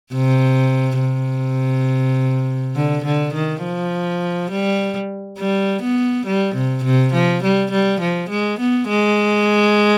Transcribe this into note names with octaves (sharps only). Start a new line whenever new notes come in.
C3
C3
D3
D3
D#3
F3
G3
G3
B3
G3
C3
C3
F3
G3
G3
F3
G#3
B3
G#3